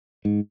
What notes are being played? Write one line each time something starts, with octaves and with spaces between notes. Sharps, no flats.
G#2